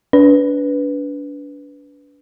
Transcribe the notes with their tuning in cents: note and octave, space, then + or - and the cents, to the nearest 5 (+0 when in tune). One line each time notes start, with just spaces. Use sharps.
D4 -35 B4 +0